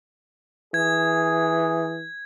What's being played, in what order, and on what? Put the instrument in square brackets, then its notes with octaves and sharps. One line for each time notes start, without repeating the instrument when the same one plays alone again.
[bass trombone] E3 [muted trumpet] G#4 [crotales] G#6